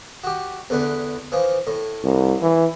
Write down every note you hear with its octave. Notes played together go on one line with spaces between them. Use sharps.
F#4 G4
E2 D3 B4
E3 F3
A2
C2
E3